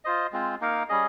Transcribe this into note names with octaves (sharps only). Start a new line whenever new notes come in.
F4 C5 D#5
G#3 C4 F4 C5
A#3 D#4 A#4 F5
G3 C#4 G#4 D#5